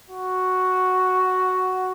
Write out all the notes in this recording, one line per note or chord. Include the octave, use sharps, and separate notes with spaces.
F#4